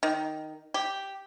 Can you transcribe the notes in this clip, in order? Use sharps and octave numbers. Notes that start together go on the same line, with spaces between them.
D#3
G4